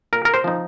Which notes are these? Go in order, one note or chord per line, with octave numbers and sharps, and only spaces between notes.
A#2 A#4
A#4
C5
F3 C4 D#4